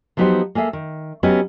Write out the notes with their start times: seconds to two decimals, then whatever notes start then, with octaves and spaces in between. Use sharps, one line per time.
0.17 F3 F#3 B3 D#4 G4 C5
0.55 A#3 G#4 A4 E5
0.73 D#3
1.23 F#3 B3 C#4 G4 D#5